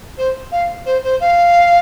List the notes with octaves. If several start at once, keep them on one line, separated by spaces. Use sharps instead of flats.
C5
F5
C5
C5
F5